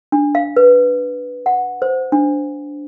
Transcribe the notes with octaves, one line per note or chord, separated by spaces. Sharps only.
D4
F5
B4
F#5
C5
D4